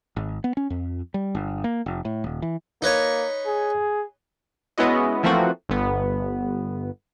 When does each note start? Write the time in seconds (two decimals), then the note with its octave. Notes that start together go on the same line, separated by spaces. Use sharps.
0.16 G#1
0.44 B3
0.57 C#4
0.70 F2
1.14 G3
1.35 G1
1.64 A#3
1.86 F1
2.05 A2
2.24 D#1
2.42 E3
2.82 A#3 D#4 B4 C#5
3.46 G#4
4.78 G#3 B3 C#4 E4 F#4 D#5
5.23 E3 F3 A3 A#3 C4 F#4
5.69 G1 B3